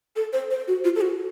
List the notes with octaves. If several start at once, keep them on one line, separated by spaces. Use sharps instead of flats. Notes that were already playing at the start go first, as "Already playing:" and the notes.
A4
C5
C5
F#4
F4
A4
F#4